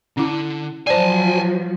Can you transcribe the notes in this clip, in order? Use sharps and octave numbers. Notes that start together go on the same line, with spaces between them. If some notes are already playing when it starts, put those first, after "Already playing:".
D3 C#4 E4
F3 F#3 C5 D5 G#5 A5